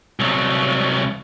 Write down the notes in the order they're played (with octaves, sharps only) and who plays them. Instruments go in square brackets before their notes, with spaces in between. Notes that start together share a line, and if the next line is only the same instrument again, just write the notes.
[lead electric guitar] C2 F#3